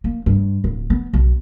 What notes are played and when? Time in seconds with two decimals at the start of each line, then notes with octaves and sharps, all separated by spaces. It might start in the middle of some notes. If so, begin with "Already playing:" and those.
0.04 A#3
0.26 G2
0.64 D1
0.90 B3
1.14 B1